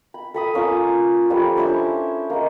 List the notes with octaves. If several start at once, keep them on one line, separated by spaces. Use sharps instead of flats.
B5
A4 B5 D#6
A#3 C#4 F4 F5
F3 G3 A4 B4
C#4 D4 E4 C5
G#3 A#3